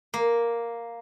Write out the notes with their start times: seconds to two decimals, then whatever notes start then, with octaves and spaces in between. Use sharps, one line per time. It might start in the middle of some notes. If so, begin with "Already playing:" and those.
0.14 A#3